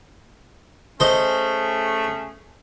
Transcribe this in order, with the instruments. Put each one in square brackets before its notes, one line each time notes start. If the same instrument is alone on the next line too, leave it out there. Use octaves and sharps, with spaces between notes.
[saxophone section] A3 C#4 G#4 [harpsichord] C5 D#5